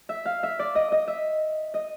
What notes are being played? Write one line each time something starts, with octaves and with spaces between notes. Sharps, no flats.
E5
F5
E5
D5
D#5
D#5
E5
D#5